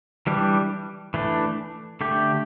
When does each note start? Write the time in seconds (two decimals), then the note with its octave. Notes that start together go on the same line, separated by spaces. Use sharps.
0.27 E3 G3 D4 G4
1.14 E3 A3 D4
2.01 D3 A3 G4